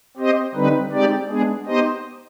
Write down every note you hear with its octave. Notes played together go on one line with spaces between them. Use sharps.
C4 G4 C5 D#5
D3 G3 C4 D#4 B4
G#3 C4 D#4 G4 D5
G#3 B3 D4 G#4
B3 D#4 G4 C5 D#5